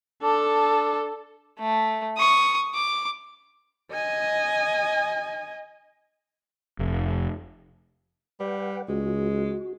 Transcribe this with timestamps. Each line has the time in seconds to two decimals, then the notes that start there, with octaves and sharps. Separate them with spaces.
0.23 D4 A4
1.59 A3
2.18 C#6 D#6
2.74 D6
3.92 D#5 G#5
6.79 F1
8.40 G3 B4 F#5 G5
8.89 C#2 G#3 F#4